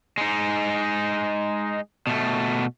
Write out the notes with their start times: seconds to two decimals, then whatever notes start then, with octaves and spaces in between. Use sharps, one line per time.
0.18 G#3 D#4
2.07 B2 A3